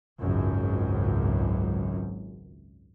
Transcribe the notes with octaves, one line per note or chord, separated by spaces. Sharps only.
G#1 C#2 F#2